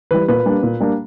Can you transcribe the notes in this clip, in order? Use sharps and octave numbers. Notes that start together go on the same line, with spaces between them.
E3 G3 B4
A#2 B4
G3 A#3 D4
A#2
G3 A#3 D4